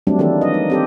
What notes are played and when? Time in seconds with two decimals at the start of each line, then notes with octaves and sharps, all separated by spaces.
0.07 F#3 G3 A3 C4 D4
0.19 D#3 E3 A#3 D4 A4
0.41 D#5
0.54 D#4
0.70 C4 G4 A4